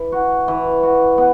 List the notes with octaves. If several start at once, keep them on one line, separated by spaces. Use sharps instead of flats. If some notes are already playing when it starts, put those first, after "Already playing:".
Already playing: E3
F#4
E3
F#4
B3